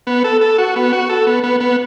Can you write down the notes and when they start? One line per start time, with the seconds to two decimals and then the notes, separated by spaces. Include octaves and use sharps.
0.07 B3
0.24 A4
0.41 A4
0.58 F#4
0.76 B3
0.93 F#4
1.09 A4
1.27 B3
1.44 B3
1.60 B3